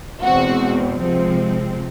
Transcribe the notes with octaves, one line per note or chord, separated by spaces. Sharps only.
E2 B2 G#3 C4 F#4
C3 F3 G#3 C4